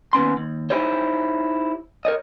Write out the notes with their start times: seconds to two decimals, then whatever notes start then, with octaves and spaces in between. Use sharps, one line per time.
0.13 D#2 B3 C#4 C6
0.37 D#2
0.70 D#4 E4 G4 C5 C#5
2.05 A#4 C#5 D#5